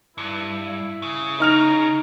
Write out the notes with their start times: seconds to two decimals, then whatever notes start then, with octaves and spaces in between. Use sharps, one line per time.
0.18 G2 E4
1.02 C#3
1.40 D#4 A#5 F6 F7